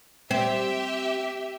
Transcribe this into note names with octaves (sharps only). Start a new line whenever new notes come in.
C4 G4 E5